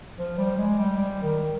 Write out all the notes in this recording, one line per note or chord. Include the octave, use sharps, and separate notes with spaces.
F3
G3
G#3
G3
G3
D#3